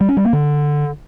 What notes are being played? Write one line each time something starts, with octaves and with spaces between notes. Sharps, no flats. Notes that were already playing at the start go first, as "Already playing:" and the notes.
G3
C#4
G3
A#3
D3